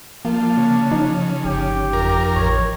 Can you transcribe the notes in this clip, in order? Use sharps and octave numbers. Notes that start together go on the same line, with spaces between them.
F3 A#3 D4
C#3
F3 D#4
G1 G4
F2 A#4
A1 C#5